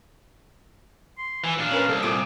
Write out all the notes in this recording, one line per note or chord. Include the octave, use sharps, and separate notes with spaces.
C6
E3 G#5
A#2 D4 F5
C#4 A#4 B4
C2 A4
A#2 D#6 D7